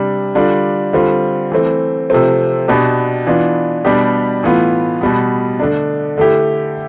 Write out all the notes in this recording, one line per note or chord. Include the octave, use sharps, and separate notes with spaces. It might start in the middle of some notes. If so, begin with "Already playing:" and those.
Already playing: C3 G3 D4
D3 G3 D4 F4
D3 G3 C4 F4
E3 A3 C4
C3 F3 A3 C4
B2 B3 D4 G4
E3 B3 D4 F4
B2 G3 B3 D4 G4
A2 E3 B3 F4
B2 G3 B3
D3 A3 D4
D3 A3 E4 G4